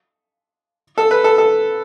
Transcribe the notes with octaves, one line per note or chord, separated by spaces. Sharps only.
A4
B4
A4
A4